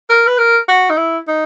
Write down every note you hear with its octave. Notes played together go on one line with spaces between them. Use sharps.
A#4
B4
A#4
F#4
D#4
E4
D#4